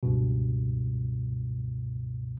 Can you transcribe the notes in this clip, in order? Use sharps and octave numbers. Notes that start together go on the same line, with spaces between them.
C#2 G2 B2